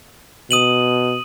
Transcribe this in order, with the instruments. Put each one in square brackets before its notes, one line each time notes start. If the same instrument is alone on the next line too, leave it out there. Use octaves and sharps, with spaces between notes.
[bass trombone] B2 [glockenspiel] D#6 D#7 F#7